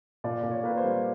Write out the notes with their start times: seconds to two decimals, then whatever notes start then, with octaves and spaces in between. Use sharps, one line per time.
0.24 A#2 D5
0.43 A#2
0.51 C#5
0.63 A#3 B4
0.77 C5
0.84 G3